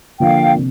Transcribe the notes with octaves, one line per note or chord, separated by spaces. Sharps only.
D3 F3 A#3 D4 F5 G5
C3